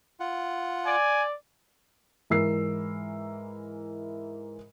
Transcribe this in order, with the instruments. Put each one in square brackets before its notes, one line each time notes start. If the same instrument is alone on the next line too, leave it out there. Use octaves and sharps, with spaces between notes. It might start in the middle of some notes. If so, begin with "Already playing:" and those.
[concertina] F4 F#5
[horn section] D5 [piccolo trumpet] G#5
[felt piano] G#2 E3 A#4 E6 C7